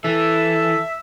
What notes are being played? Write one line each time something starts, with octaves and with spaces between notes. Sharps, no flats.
E3 A4 E5